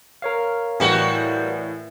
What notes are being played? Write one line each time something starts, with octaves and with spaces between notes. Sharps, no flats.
A#4 C#5 F5
A2 E3 G3 F#4